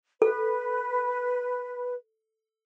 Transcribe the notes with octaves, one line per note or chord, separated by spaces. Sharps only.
A4 B4